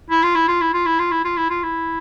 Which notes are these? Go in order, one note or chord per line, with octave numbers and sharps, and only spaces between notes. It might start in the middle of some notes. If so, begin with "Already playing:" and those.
E4
F4
E4
F4
E4
F4
E4
F4
E4
F4
E4
F4
E4